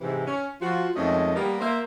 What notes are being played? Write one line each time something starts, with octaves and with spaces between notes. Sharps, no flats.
G#2 C3 E3
C#4
F3 F4 F#4
F2 D#3 G#3 A3 C#4 D#5
G3 A#3 B3 G4 A#4
A#3 C5 E5